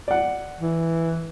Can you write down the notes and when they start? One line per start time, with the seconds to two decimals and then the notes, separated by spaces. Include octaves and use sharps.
0.08 D5 F#5
0.61 E3